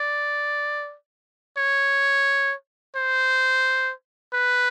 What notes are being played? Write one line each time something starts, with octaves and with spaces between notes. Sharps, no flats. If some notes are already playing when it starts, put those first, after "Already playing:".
Already playing: D5
C#5
C5
B4